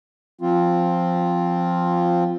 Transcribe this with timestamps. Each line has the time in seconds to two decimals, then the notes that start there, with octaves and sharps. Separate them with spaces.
0.41 F3 C4 F4